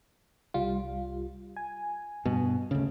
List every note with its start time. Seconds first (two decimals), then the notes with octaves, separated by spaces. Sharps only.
0.54 C2 G3 F4
1.57 G#5
2.25 G2 B2
2.71 D2 C#3